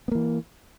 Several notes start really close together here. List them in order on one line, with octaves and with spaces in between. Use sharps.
B3 A#3 E3